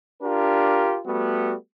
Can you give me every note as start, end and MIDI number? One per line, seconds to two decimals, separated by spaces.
0.22 0.98 62
0.22 0.98 65
0.22 0.98 67
0.22 0.98 70
1.06 1.55 55
1.06 1.55 57
1.06 1.55 59
1.06 1.55 66